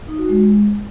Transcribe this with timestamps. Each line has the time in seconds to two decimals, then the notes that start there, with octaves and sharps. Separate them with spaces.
0.08 D#4
0.18 F#4
0.29 G#3